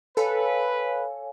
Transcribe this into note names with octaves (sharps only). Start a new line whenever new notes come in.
A4 B4 C#5 F5 G#5